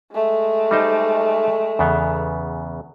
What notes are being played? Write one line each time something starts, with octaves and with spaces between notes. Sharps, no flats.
G#3 A3
G3 D#4 C5
E2 C#3 B3